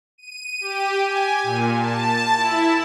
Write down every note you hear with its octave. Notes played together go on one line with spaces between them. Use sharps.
D#7
G4
G#5
A#2
A5
E4